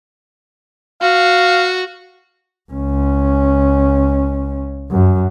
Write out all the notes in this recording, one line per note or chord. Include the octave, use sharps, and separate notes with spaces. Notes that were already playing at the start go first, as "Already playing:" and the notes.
F#4 F5
C#2 C#4
F#2